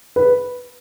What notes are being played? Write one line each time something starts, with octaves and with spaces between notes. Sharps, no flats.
B4